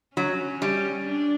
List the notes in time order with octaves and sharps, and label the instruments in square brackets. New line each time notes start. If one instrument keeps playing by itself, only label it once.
[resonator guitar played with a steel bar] F#3 [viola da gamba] C#4
[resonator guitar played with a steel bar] G3
[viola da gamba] D4